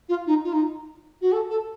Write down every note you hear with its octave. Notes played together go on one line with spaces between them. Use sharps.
F4
D#4
F4
D#4
F#4
A4
A4